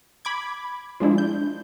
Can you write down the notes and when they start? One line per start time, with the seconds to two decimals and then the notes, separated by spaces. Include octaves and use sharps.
0.25 B5 D6 G#6
1.00 F3 G#3 D4 E4
1.18 G6